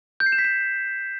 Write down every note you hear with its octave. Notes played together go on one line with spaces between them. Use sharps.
G6
C7
E7
B6
E7